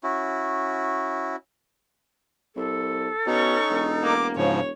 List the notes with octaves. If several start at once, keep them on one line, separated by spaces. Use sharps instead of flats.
C#4 E4 F#4
C2 A4
B2 C#4 D#4 C#6
E1
A#3 D6
G#2 C#3 F3 C#5